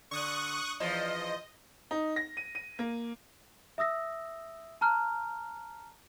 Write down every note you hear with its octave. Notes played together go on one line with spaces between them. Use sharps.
D3 C#6 D#6 F#6
E2 F3 D#5
D#4
A#6
D#7
D#7
A#3
E5 D#6 E6 A#6
A5 A#5 F6 F#6